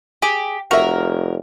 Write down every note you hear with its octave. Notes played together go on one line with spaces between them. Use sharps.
G4 G#4
F1 F#4 A#4 E5